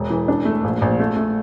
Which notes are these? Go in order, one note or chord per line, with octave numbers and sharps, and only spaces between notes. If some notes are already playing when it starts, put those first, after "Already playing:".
Already playing: E1
E3
D4
A3
A#1
A#1
A3
A3